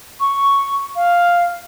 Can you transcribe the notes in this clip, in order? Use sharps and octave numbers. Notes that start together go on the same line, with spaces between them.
C#6
F5